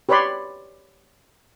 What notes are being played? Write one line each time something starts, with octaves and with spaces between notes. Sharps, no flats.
G4 B4 C#5 D5 B5 C6